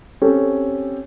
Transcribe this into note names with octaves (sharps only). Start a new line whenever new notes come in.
C4 C#4 G4 A4